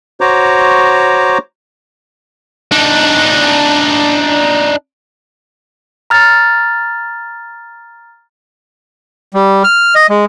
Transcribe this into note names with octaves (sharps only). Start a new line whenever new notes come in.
F#4 C5 C#5 A#5 D6
D4 D#4
A#5 F6 A6
G3
F6
D#5
G#3